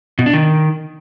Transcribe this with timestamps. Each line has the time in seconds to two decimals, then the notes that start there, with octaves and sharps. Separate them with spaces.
0.19 B2
0.26 D4
0.34 D#3